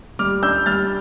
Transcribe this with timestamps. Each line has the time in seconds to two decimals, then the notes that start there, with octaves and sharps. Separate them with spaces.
0.19 G3 D6 F6
0.43 D4 E6 G6
0.66 G3 F6 A6